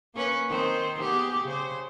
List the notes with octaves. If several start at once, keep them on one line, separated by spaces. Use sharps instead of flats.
A#3 C#4 B4
D#3 C4 C5
B3 G4 G#4
C#3 C5